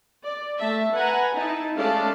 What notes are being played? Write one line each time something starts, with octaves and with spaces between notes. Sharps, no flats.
D5
A3 E5 A5
B4 F#5 G#5 A#5
D#4 E4 A5
G#3 A3 C#4 D5 F5 A5